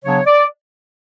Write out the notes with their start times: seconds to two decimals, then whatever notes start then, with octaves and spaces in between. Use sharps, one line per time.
0.04 C#3 F#3 B3 D4 C#5
0.25 D5